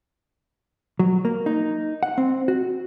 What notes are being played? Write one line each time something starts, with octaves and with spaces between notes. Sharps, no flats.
F#3
A#3
D#4
F#5
C4
F#4